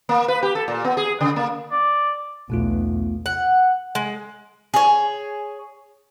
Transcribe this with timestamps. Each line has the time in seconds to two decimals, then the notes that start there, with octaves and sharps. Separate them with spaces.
0.09 A#3
0.28 B4
0.43 G4
0.55 A4
0.68 A#2
0.84 B3
0.97 G#4
1.21 C#3
1.36 A#3
1.71 D5
2.50 B1 E2 B2 A3 F4
3.26 F#5
3.95 G#3
4.74 G#4 C#5